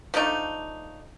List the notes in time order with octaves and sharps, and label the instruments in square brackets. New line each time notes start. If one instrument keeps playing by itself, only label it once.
[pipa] F3 A3 D4 D#4